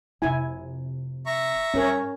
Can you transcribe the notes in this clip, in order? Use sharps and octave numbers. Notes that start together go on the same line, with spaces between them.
F1 C3 E4 G#5
E5 A#5 C#6
G2 C#4 A#4 C#5